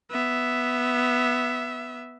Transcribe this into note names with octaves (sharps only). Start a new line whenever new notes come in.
B3 E5